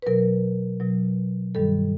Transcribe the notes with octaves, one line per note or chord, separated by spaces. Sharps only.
B4
B2 F#3 A#4
B2 F#3
G2 D#3 G3 A4